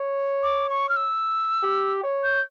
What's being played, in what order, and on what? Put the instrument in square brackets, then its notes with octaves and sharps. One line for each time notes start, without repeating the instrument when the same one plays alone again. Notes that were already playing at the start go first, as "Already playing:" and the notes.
Already playing: [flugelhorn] C#5
[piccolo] D6
C#6
F6
E6
[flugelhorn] G4
C#5
[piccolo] G6